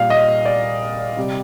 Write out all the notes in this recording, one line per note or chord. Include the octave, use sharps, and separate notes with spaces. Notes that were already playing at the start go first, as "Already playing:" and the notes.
Already playing: A#2 G3 F5
D#5
D5
C3 G3